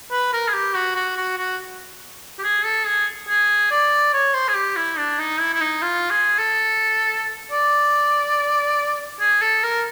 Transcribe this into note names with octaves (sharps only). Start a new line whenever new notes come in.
B4
A#4
G#4
G4
F#4
F#4
F#4
F#4
G4
G#4
A4
G#4
G#4
D5
C#5
C5
G#4
G4
E4
D4
D#4
E4
E4
D#4
F4
G#4
A4
D5
G#4
A4
A#4